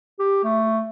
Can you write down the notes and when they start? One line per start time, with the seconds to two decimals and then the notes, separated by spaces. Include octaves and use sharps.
0.19 G4
0.44 A3